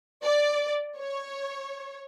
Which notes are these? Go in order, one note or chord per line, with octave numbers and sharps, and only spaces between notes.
D5
C#5